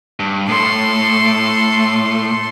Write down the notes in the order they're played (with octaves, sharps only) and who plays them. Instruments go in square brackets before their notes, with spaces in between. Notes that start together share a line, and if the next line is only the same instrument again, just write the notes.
[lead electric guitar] G2
[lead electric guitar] A2 [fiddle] A4 C6